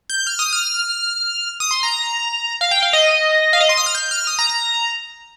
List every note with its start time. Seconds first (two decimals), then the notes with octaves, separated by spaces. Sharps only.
0.10 G6
0.27 F6
0.39 D#6
0.53 F6
1.60 D#6
1.71 C6
1.83 A#5
2.61 F5
2.71 G5
2.82 F5
2.93 D#5
3.53 F5
3.61 D#5
3.69 C6
3.77 D#6
3.86 F6
3.95 G6
4.11 F6
4.27 D#6
4.39 A#5
4.50 A#5